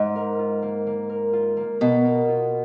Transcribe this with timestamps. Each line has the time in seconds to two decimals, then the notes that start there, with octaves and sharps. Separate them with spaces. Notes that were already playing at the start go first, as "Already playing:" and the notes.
Already playing: G#2
0.16 A#4
0.39 F4
0.62 A#3
0.87 A#3
1.09 A#4
1.33 F4
1.57 A#3
1.81 B2 A#3
2.04 A#4
2.29 F4